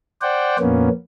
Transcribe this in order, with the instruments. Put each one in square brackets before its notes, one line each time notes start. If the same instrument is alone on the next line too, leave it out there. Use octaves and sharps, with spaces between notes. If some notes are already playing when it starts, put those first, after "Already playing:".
[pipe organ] C5 D5 F#5 G5
F2 A#2 A#3 B3 C#4